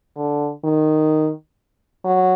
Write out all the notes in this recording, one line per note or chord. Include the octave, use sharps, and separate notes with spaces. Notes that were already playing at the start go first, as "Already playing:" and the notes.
D3
D#3
F#3